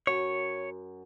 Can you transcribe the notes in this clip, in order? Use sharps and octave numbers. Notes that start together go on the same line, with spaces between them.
F#2 C#5